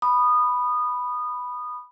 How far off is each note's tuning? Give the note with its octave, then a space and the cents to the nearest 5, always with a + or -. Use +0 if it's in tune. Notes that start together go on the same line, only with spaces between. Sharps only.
B5 +0 D#6 -20